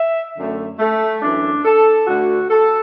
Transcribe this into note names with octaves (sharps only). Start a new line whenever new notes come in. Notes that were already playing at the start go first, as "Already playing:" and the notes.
Already playing: E5
F#2 D3 A3
A3
F#2 E3 A3 D4
A4
D2 D3 A3 F#4
A4